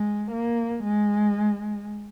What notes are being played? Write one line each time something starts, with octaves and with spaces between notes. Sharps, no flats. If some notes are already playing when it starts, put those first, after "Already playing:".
Already playing: G#3
A#3
G#3